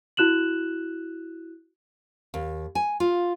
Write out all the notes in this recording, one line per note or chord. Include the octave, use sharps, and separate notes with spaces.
E4 F#4 F#6 E7 F#7
D#2
G#5
F4